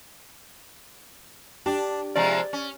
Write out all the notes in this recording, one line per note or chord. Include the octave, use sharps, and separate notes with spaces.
D4 G4
C3 F3 G#3 D5
C#4